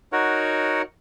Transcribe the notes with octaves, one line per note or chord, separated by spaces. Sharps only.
D#4 F#4 A#4 C#5 F#5